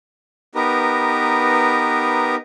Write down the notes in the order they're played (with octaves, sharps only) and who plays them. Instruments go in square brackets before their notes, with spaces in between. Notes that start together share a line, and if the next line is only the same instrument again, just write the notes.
[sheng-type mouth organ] B3 D#4 G4 A#4 B4 A#5